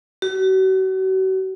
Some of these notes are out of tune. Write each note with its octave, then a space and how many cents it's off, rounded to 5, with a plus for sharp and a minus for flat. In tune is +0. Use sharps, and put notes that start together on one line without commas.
F#4 +40